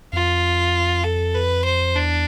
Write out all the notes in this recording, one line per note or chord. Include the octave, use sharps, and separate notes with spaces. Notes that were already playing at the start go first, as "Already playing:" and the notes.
F2 F4
A4
B4
C5
E2 D4